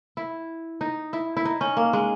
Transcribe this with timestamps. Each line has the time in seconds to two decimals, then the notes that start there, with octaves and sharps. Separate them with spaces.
0.17 E4
0.81 D#4
1.13 E4
1.37 E4
1.45 D#4
1.61 C#4
1.77 A#3
1.93 G#3